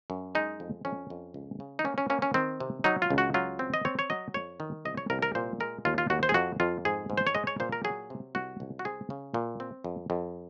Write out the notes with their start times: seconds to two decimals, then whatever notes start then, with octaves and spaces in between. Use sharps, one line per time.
0.10 F#2
0.35 G#3 D#4
0.60 F2
0.85 F2 C#4
1.10 F2
1.34 C#2
1.60 C#3
1.79 D#4
1.85 A#3 C#4
1.98 C#4
2.10 A#3 C#4
2.22 C#4
2.34 D#3 C4
2.60 C3
2.84 F#3 D#4
3.02 F4
3.10 C#2
3.18 F#4
3.34 F#3 F4
3.59 C4
3.74 D#5
3.85 C4 C#5
3.99 C#5
4.10 F#3 D#5
4.34 F2 C#5
4.60 D#3
4.85 C2 D#5
4.97 C#5
5.10 C2 A#4
5.22 A#4
5.35 A#2 C5
5.60 G#3 A#4
5.85 D#2 F4
5.98 F4
6.10 D#2 F#4
6.23 C5
6.29 G#4
6.34 F2 F#4
6.60 F2 F4
6.85 G#2 G#4
7.10 G#2
7.18 C5
7.27 C#5
7.35 G#3 D#5
7.47 C#5
7.60 A#2 C5
7.72 A#4
7.84 F#3 G#4
8.10 C3
8.35 C2 F#4
8.60 C2
8.79 F#4
8.85 C4 G#4
9.10 C#3
9.34 A#2
9.60 C4
9.84 F2
10.10 F2